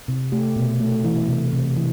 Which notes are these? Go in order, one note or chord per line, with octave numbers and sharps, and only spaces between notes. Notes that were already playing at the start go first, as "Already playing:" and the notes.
C3
A3 G4
B2
A3
E3
C3
C3
E3